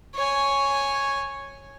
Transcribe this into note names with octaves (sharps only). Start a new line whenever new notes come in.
C#5 G#5